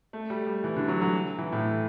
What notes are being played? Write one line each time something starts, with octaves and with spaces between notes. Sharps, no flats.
A3
G3
G3
E3
D3
F#3
F#3
E3
A2